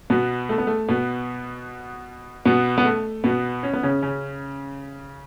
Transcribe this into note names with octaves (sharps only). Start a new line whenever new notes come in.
B2 B3
A3
B3
A3
B2 B3
B2 B3
B3
A3
B2 B3
C#4
B3
C#3 C#4
C#3 C#4